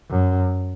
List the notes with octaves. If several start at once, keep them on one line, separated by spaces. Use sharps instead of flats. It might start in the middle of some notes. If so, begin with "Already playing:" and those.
F#2